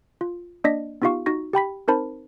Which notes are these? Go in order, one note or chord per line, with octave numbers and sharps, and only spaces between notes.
F4
A#3 D4 D5 D#5 A#6 B6
B3 D#4 F4 G4 F5 C#6
D#4 F#4 C#6 A#6
G4 G5 B5 B6
C4 D#4 A#4 C5 A5 B5